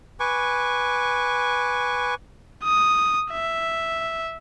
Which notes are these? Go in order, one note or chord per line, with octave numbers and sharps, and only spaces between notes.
B4 G#5 C#6 D6
D#6
E5